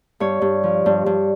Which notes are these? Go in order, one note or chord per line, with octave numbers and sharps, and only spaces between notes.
G2 C#5
G2
F3
G2
G2